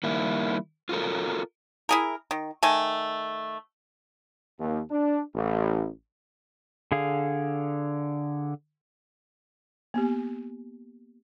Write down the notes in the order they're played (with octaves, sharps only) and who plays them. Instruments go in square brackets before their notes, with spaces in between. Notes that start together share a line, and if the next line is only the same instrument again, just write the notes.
[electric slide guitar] D#3 G3 A#3 E4
F4 F#4 A4 A#4
[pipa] E4 G#4 A#4
D#3
D#3 A3 G#5
[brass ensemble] D#2
D4
A1
[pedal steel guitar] D3 G#4 F5
[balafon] A#3 B3 G4